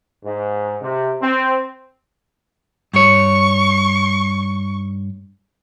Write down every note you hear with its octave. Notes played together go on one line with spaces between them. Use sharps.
G#2
C3
C4
G2 C#5 C#6